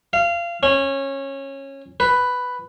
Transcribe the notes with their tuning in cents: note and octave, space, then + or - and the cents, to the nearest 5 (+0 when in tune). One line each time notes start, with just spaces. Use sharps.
F5 -25
C#4 -20
B4 +5